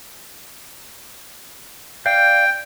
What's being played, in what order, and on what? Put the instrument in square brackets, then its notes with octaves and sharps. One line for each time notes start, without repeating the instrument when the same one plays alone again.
[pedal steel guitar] D5 F5 G6 [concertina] G5